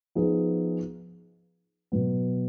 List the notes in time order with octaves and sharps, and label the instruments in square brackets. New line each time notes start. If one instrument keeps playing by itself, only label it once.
[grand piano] F3 B3 D#4 G#4
B2 F#3 B3